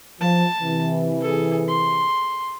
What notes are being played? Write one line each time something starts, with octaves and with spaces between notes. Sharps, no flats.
F3 A5
C3 E3
G#4 A4
C6